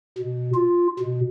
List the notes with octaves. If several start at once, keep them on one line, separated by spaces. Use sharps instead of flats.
B2
F4
B2